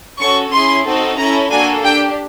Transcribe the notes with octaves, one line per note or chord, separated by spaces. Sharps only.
C#4 F#4 A4 C#6
C#4 E4 G#4 C6
C4 D#4 F#4 A4
C#4 E4 A4 A#5
A#3 D4 F#4 A4 G#5
D4 G4 G5